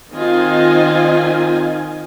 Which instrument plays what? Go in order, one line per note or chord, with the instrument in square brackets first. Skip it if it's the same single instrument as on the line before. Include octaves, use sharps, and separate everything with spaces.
[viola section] D#3 C4 F4 D#5 G#5